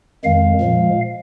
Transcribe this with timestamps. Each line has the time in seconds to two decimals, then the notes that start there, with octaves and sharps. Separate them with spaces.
0.24 F2 D#3 G#3 F5
0.60 A#2 F3 G#3